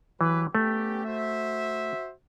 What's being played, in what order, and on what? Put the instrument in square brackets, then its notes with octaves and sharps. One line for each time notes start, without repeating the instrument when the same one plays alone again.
[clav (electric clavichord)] E3 [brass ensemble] F#3 G4 B4
[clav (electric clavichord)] A3 [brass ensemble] B3 C#4 G4
[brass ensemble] F#4 C5 E5